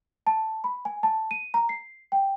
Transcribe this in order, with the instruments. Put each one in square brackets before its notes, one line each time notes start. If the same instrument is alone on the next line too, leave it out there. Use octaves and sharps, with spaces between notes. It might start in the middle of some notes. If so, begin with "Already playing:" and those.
[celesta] A5
B5
G#5
A5
D#7
A#5
C7
G5